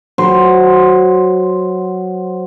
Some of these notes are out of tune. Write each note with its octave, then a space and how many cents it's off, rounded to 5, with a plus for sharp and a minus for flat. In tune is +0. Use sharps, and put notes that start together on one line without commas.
F#3 +0 C5 +0